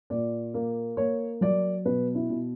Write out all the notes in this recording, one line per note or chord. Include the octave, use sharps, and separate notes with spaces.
A#2 D5
A#3
A#3 C#5
F#3 D5
B2 B4
E4
B2